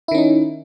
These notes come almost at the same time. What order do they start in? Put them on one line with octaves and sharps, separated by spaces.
E4 D#3 C#4 D#4